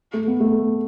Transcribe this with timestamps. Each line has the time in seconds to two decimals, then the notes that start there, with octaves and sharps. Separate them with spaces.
0.14 A3
0.27 B3
0.40 A3